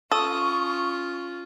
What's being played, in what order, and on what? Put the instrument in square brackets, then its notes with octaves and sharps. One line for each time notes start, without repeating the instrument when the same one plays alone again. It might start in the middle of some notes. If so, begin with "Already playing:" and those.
[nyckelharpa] C#4 F4 [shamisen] A4 [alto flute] C#6 [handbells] D#6